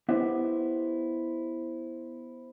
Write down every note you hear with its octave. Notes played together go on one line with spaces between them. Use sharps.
B3 E4 G4 B4 C5 D#5